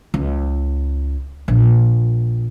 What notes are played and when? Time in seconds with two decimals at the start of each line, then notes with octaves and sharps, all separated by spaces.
0.14 C#2
1.48 A#1